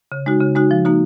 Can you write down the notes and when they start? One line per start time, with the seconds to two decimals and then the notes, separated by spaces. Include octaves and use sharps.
0.12 C#3
0.26 G#3 D#4 F#4
0.41 C#3
0.55 G#3 D#4 F#4
0.71 F3
0.85 A#3 D#4 F#4